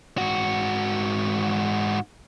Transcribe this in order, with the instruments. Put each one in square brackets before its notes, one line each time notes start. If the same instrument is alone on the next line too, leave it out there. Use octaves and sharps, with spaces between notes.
[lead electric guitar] G#2 F#4